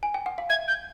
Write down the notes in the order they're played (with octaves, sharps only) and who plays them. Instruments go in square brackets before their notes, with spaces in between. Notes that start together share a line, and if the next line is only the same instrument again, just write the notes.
[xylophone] G#5
G5
F#5
F5
[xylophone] E5 [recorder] G#6
[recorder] G6